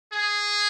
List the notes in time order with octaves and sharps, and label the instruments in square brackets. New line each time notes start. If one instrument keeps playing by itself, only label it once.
[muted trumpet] G#4